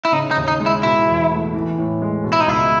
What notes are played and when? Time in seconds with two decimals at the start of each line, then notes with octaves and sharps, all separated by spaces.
0.05 E4
0.12 C#3 D#4
0.31 D#4
0.37 D#2
0.48 D#4
0.60 G#3
0.66 E4
0.83 B2 E4
1.07 E2
1.31 A3
1.54 E3
1.78 A2
2.02 G#3
2.24 B2
2.33 E4
2.40 D#4
2.48 C#2 E4